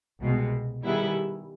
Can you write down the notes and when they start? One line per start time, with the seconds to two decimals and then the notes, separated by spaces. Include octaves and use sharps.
0.20 C2 B2 G#3
0.82 D#3 G3 B3 E4 G#4